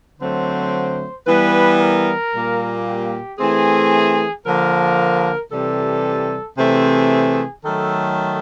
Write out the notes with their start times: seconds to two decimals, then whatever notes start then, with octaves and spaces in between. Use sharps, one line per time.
0.20 D3 F#3 A3 C4 C5
1.27 E3 G3 B3 B4
1.79 A#4
2.34 A#2 G3 A#3
2.86 G4
3.39 E3 A3 C4 G#4
4.46 D3 F3 A#3 A#4
5.52 C3 E3 G3 A4
6.57 C3 E3 A3 C4 G#4
7.65 D#3 F#3 A3 A4